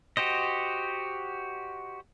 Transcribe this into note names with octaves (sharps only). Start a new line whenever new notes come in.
F#4 G4 C5 D#5